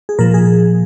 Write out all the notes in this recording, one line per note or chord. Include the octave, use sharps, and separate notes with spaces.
G#4
A#2 F3 A#4
G#4